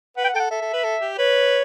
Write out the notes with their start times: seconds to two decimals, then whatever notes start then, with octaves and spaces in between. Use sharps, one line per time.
0.17 B4 F#5
0.24 G5
0.28 F#5
0.34 A4 G5
0.40 F#5
0.51 A4 E5
0.62 A4
0.73 B4
0.84 A4
1.01 G4
1.18 B4 C#5